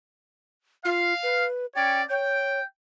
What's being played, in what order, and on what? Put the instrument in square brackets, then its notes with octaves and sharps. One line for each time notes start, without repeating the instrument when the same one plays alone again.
[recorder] F4 [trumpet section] F5
[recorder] B4
[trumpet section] C#4 C#5 D5 [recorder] G5
[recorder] C#5 [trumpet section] G5